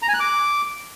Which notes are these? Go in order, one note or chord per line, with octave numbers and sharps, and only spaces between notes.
A#5
G#5
F#6
D6